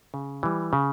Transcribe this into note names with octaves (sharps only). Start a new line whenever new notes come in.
C#3
E3 G3
C#3